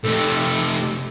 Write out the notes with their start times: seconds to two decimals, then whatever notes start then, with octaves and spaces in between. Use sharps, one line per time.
0.04 C3 A3 A4